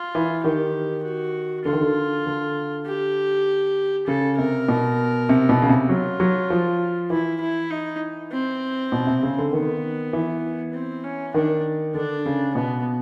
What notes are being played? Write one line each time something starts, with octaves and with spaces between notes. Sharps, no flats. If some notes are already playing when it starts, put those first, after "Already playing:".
Already playing: F4
E3
D#3 G4
F#4
D3 F4
D#3
D3
D3
G4
C#3 A4
C3 A#4
B2
C3
B2
C#3
C3
F#3 F4
F#3
F3
E3 E4
E4
D#4
C4
B2
C3
C#3
D3
D#3 B3
E3
C4
C#4
D#3 D4
D3 D4
C#3
B2 B3